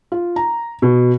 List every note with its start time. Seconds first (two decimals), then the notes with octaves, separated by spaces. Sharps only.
0.12 F4
0.36 A#5
0.82 B2